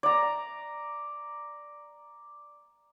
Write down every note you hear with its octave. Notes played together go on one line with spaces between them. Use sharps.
D5 A#5